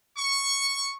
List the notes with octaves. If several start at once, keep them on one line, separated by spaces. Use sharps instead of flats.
C#6